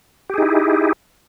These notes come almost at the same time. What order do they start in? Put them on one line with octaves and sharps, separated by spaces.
G4 G#4 D#4 E4